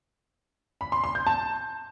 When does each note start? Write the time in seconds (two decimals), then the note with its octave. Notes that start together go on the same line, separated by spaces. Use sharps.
0.81 B5
0.92 C6
1.04 C6
1.15 G6
1.27 A5